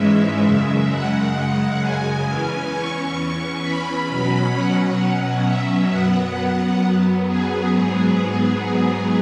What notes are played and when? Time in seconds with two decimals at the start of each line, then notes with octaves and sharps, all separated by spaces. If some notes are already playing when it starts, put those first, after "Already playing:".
Already playing: G#2 E3 G#3 C#4 E5
0.44 F#2 C#3 G#3
0.90 F#5
1.81 G#5
2.26 E2 E3 C#4
2.71 C#6
3.62 B5
4.08 B2 F#3 C#4
4.53 F#5
5.44 E5
5.89 F#2 F#3 B3 F#5
7.26 G#4
7.71 G#2 F#3 B3